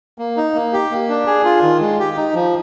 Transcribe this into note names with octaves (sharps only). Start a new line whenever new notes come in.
A#3
D#4
A#3
G4
A#3
D4
G#4
F4
D#3
G#3
G4
D#4
F3